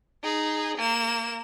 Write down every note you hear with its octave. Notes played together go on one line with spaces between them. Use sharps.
D#4 G#4
A#3 E7